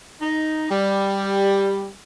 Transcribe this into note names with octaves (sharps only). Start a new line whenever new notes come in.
D#4
G3